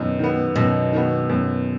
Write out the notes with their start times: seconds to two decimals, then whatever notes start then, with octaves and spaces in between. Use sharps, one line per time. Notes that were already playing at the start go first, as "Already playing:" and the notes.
Already playing: F#2 B2 D#3 B3
0.19 D#3 B3
0.55 F#2 B2
0.93 D#3 B3
1.29 F#2